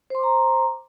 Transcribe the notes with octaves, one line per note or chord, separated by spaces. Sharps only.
C5 A#5 C6 D6